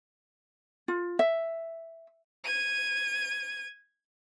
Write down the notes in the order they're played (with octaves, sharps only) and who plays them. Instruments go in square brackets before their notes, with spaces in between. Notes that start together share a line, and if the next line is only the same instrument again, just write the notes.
[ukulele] F4
E5
[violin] G#6 D#7